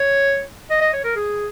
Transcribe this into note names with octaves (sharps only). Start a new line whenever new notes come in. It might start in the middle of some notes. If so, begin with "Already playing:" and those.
Already playing: C#5
D#5
D#5
C#5
A#4
G#4